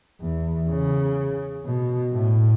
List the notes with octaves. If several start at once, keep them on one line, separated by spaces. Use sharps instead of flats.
E2
C#3
B2
A2